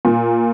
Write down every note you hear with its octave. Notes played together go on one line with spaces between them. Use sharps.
A#2